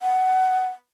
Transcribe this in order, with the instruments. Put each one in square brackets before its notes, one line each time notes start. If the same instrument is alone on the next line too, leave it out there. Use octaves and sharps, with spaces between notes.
[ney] F#5